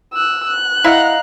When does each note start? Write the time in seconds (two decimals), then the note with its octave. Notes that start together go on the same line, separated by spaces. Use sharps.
0.13 E6 F#6
0.47 F#6
0.84 E4 D#5 F5 F#5 A#5